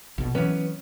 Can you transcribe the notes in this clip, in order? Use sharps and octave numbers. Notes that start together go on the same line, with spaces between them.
A#1 B2
E3 F#3 B3 C#4